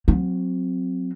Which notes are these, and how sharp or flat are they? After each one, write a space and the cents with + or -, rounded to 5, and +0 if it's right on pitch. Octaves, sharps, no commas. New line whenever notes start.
F#3 -20 C4 +0